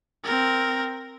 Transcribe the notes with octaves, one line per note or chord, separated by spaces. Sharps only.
C4 A#4